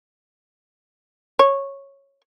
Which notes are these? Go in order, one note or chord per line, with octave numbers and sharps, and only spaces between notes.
C#5